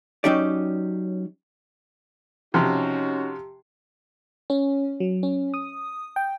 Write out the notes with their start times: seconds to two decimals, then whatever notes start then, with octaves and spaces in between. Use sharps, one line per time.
0.24 F#3 C#4 D#4 G4 D5
2.54 C3 F3 C#4 D#4 F#4
4.50 C#4
5.00 F#3
5.23 C#4
5.54 D#6
6.16 G5